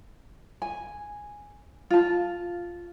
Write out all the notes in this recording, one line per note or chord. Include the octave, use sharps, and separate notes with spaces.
G#5
F4 A5